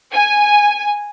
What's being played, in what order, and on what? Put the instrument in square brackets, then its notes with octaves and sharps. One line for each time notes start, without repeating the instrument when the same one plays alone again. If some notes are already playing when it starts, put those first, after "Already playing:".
[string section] G#5